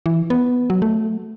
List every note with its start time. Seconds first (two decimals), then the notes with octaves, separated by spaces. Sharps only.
0.06 E3
0.30 B3
0.70 F#3
0.82 A3